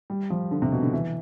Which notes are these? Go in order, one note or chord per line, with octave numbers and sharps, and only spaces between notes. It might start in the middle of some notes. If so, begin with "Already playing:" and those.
G3
F3
D3
C3
B2
D3
E3